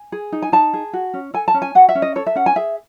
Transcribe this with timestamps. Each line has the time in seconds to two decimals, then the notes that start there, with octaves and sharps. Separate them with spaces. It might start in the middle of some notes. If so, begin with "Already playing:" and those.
Already playing: G#5
0.12 G#4
0.32 D#4
0.42 G#5
0.52 D#4 A5
0.74 G#4
0.93 F#4
1.14 C#4
1.34 A4 G#5
1.48 A5
1.54 C#4
1.62 G#5
1.75 F#4 F#5
1.89 E5
1.95 C#4
2.02 D#5
2.16 A4 C#5
2.27 E5
2.36 C#4 F#5
2.46 G#5
2.56 G#4 E5